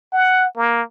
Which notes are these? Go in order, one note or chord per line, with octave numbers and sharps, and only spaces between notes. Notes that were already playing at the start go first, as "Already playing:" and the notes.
F#5
A#3